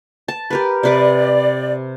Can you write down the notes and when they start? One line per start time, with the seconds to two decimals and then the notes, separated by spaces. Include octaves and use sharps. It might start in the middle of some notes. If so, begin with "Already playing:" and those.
0.28 A5
0.50 G4 A#4 B4
0.83 C3 B4 D5 D6